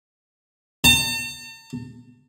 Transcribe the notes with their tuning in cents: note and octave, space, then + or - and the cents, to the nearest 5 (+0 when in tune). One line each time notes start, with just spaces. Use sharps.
A5 +45